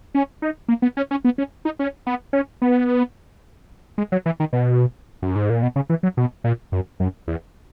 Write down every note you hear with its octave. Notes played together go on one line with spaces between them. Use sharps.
C#4
D#4
A#3
B3
C#4
C#4
B3
C#4
D#4
C#4
B3
C#4
B3
G#3
F#3
E3
D#3
B2
F#2
G#2
A#2
B2
C#3
E3
F#3
B2
A#2
F#2
F#2
E2